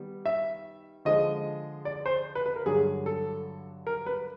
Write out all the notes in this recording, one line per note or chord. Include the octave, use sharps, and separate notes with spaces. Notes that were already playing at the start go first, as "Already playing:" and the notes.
Already playing: D#3 G3 B3
E5
D3 F3 G#3 D#5
D5
C5
B4
B4
A#4
G2 D3 F#3 G#4
A4
A#4
B4